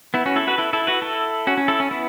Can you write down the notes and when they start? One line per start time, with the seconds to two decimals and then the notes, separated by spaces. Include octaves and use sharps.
0.14 B3 E4
0.26 C#4 F#4
0.36 E4 A4
0.47 F#4 B4
0.58 E4 A4
0.73 E4 A4
0.87 F#4 B4
1.02 E4 A4
1.47 C#4 F#4
1.57 C#4
1.68 E4 A4
1.80 C#4
1.91 B3 E4